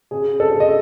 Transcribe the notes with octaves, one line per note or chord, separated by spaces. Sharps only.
C#3 G#4
A4
C#3
D#5